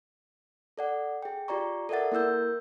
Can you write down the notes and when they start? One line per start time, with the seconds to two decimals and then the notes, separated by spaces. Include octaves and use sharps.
0.78 A4 D5 F#5
1.23 G#4 G5
1.48 F4 G4 D5 A#5 C#6
1.89 A4 A#4 D5 E5 F#5 A6
2.12 A#3 E4 A#4 E6 G6